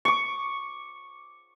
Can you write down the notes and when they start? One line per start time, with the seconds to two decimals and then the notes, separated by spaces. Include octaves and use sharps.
0.05 C#6 D6